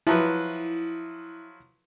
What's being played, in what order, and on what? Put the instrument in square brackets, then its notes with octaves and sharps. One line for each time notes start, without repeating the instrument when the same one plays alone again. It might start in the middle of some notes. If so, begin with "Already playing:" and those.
[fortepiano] F3 F#3 B4 [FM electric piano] E4